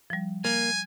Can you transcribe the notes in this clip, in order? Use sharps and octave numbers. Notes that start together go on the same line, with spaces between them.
F3 G3
A#3 G#5